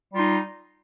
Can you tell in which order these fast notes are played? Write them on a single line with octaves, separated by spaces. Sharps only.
G3 F4 D#4